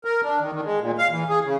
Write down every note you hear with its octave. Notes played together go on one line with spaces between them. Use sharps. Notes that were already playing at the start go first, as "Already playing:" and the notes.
A#4
D4
D#3
D#3
G#3
A#2
F5
E3
G#4
C#3